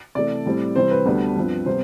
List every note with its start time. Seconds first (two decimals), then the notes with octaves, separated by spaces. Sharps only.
0.15 C3 E3 A3 D5
0.46 A2 G3 C4
0.76 C3 E3 G3 C4 C5
0.91 B4
1.06 D2 D3 G3 B3 D4
1.36 G2 F3 C4
1.66 C3 G3 B3 C5